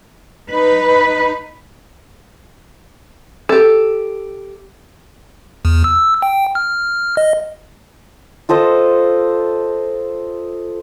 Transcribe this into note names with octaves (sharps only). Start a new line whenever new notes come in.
D#4 B4
G4 A4
E2
E6
G5
F6
D#5
F4 A4 C5 D#5